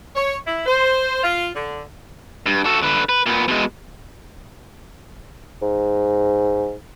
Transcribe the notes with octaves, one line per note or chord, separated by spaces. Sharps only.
C#5
E4
C5
F4
D3
G2
F#4 A4
D3 B4
B4
A#2 B3
B2 G#3
G#2